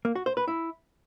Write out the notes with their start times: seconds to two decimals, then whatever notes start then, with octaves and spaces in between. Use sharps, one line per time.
0.05 A#3
0.15 F#4
0.26 C5
0.37 B4
0.48 E4